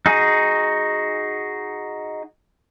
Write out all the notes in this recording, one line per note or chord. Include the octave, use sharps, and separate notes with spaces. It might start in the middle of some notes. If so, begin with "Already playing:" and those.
D#4 F#4 G#4